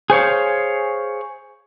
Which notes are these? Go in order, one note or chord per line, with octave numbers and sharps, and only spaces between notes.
G#4 C5 C#5 F5